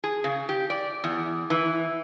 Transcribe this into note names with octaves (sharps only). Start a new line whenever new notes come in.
G#4
C#3
G4
D5
E2
E3